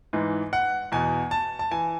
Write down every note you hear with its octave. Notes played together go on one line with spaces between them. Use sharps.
G#2 E3
F#5
E2 B2 G#5
A5
A5
E3 G#5